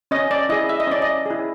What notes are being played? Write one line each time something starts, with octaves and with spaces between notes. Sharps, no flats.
C#4 D#5
D5
E4 G#4 D#5
E5
D#5
C#4 D5
D#5
E4 G#4